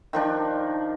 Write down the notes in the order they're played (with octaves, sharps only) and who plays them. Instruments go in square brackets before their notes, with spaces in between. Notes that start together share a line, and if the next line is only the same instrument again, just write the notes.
[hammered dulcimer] D#3 F3 D4